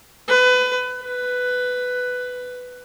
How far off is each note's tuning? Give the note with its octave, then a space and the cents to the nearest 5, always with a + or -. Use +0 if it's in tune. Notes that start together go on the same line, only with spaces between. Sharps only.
B4 +25
B4 +10